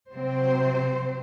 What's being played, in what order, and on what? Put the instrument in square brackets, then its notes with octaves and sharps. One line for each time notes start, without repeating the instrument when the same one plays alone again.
[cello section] C3 F#3 C4 C5